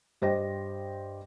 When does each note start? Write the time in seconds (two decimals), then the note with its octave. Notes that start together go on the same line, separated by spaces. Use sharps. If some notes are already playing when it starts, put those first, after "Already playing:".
0.22 G2 G4 C5 D#5 G5 A#6